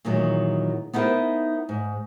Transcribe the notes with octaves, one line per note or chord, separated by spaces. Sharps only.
A#2 D#3 E3 F#3 G#3
B3 D#4 E4 G4 A#4 C5
G#2